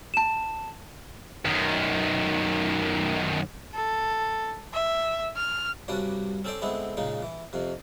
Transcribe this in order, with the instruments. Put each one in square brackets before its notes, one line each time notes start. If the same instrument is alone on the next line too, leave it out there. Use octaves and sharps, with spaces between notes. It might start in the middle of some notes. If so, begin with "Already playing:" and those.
[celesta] A5 E7
[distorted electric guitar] F#2 D#3
[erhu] A4
E5
F6
[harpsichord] C2 G2 G3 C#4 D4 F#4
C4 C#4 A4 C5 D5
D3 G#3 B3 C4 E4
A#2 C#3 G#3 D#4
E3
F2 C3